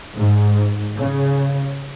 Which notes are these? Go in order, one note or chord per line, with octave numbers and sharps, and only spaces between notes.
G#2
C#3